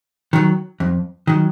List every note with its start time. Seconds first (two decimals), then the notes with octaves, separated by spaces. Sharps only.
0.33 D#3 F#3
0.80 F2
1.27 D#3 F#3